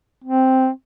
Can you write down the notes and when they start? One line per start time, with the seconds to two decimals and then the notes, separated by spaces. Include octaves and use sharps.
0.24 C4